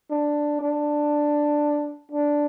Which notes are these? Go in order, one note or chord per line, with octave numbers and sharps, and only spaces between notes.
D4
D4
D4